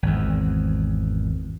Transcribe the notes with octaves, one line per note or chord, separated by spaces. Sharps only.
G#1 E2